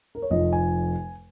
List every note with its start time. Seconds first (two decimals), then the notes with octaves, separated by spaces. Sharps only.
0.15 A#4
0.22 C#5
0.30 F1 F2 F3 D#5
0.53 G#5